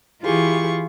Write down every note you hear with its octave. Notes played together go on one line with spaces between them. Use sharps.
E3 E4 F4 G4 G#4 C#6